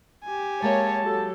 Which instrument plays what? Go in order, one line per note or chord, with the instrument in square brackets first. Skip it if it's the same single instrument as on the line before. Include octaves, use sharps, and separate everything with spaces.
[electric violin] G4 G#5
[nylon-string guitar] G#3 A#3 E5 [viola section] C#5 [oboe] A5
[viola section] F#3 G4 A4